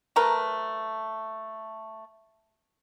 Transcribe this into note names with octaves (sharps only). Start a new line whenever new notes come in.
F#3 A3 A#4 B4